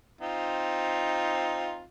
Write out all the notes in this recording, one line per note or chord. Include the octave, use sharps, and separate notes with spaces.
C4 D#4 F4